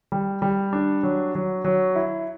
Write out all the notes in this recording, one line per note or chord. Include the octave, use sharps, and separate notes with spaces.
G3
G3
D4
F#3
F#3
F#3
E4